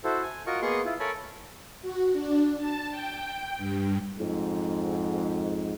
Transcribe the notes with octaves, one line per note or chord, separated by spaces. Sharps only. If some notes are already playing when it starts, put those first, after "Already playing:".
E4 F#4 A4 C5
G#5
F4 F#4 A#4 D#5 C#6
A#3 B3 G#4 D#5 C6 C#6
E4 F4
A4 A#4 C#5 G#5 A5 B5
F#4
D4
A5
G5
G2
F2 G#2